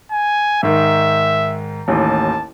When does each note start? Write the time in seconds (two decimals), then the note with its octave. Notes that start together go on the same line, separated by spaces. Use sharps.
0.12 G#5
0.63 G#2 D#3 E5
1.88 A1 D#2 A5